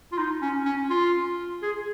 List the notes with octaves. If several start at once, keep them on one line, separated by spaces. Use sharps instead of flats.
F4
D#4
C#4
C#4
F4
G#4